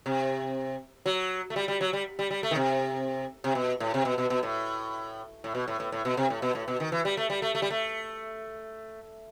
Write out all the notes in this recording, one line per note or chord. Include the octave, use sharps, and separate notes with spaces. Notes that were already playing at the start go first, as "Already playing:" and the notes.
C3
F#3
A3
G3
G3
F#3
G3
G3
G3
A3
D#3
C3
C3
B2
A2
C3
B2
B2
B2
A2
A2
B2
A2
A2
A2
B2
C3
A2
B2
A2
B2
D#3
E3
G3
A3
G3
A3
A3
G3
A3